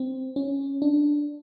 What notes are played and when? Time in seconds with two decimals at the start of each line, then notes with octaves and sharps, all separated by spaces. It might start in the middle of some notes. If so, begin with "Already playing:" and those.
Already playing: C4
0.36 C#4
0.82 D4